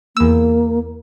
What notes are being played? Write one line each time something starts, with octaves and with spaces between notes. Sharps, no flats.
E2 A#3 E6